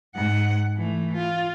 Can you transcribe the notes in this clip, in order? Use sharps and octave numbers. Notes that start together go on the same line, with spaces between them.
G#2 F#5
E3 A3
F4